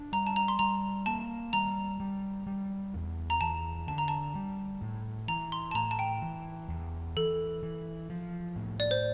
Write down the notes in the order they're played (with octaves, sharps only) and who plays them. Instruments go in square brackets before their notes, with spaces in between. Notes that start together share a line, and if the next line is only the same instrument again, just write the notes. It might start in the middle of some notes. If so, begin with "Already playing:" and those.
Already playing: [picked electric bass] D4
[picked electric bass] G3 [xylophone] A#5
[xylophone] A5
A#5
C6
[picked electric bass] G3 [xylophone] A#5
[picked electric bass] A#3 [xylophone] A5
[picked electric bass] G3 [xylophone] A#5
[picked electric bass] G3
G3
E2
[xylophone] A#5
[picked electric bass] E2 [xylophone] A5
[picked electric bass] D3 [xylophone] A5
[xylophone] A#5
A5
[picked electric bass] G3
A2
[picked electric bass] E3 [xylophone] A#5
[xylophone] C6
A5
[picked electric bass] A2 [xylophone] A#5
[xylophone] A5
G5
[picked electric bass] E3
E2
[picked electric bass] E3 [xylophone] A4
[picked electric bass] E3
F3
A2
[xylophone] D5
C5